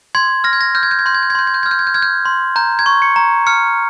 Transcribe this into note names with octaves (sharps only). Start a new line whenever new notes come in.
C6 G#6
F6 A#6
G#6
A#6
F6 G6
G#6
G6
G#6
C6 G6
G#6
G6
G#6
C6 G6
G#6
G6
F6 G#6
G6
G#6
G6
F6 G#6
G6
C6
A#5 G6
G#6
C#6
C#7
A#5
F6 C#7